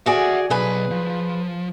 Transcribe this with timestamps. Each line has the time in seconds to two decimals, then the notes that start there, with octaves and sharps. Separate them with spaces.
0.06 F#4 G#4 D5 E5 F#5
0.50 B1 G#4 B4
0.91 F3